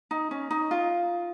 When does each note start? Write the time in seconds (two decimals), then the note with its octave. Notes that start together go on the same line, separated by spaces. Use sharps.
0.11 D#4
0.31 C#4
0.51 D#4
0.71 F4